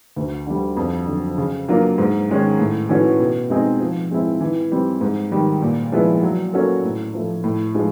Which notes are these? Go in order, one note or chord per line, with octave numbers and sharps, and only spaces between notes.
D2
D3 G3
F2
D3 F#3
C#3
F#3 A#3 D4 F4
G#2
D#3 G#3 C#4
A2
E3 A3 C#4 F#4
B2
G#3 C4 D#4 G#4
F3
G#3 C4 E4
E3
G3 C4
G#2
D#3 G3
A#2
F3 G#3 B3 E4
F#3
A#3 C#4 F#4 A4
A2
F3 A3
A2
F3 G#3